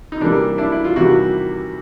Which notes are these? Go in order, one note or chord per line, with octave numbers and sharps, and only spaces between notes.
D#4
C3 E3 G3 A#3 D4
D4 E4
E4
F4
E2 C3 D#3 G3 E4 F#4